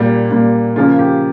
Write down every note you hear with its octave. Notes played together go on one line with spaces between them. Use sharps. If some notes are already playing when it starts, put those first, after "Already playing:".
Already playing: A#2 G3 A#3
A#2 G3 A#3
C#3 F3 A#3 F4
G4